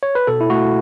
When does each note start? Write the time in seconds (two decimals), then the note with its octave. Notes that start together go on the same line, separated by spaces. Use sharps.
0.03 C#5
0.15 B4
0.27 B2 A4
0.41 E4
0.50 A3 F#4